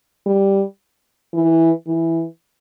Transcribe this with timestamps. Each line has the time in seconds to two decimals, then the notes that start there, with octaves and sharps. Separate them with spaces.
0.26 G3
1.34 E3
1.87 E3